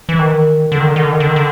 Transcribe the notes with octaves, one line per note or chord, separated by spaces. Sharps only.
E3
D#3
D3
D#3
D3
D#3
D3
D#3
D3
D#3
D3